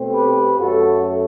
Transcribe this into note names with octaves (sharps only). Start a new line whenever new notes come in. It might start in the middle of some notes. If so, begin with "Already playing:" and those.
Already playing: B2 A3 C4
G4 B4
F#2 F#3 A3 F#4 A4